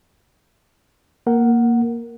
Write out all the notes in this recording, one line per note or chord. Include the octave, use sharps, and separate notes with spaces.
A#3 A#4 F#5